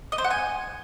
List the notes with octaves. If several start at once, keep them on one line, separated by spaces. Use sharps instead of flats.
D#5
C5
F#5
G#5